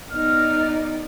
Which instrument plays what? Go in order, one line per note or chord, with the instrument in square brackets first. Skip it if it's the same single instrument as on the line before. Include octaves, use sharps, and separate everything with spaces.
[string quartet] B3 D#4 D5 [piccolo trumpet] F6